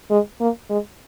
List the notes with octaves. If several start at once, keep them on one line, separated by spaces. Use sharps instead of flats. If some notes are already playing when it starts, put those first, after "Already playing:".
G#3
A#3
G#3